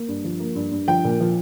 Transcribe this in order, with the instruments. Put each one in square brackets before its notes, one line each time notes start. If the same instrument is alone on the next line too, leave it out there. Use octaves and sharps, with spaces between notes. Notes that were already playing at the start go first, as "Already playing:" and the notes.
Already playing: [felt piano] A#3
G2
F3
A#3
G2
G2
F3 G5
A#2
F3